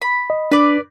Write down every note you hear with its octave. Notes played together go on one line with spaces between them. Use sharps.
B5
D#5
D4 B4 D5